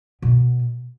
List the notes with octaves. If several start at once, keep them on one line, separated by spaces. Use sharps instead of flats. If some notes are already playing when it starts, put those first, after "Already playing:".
B2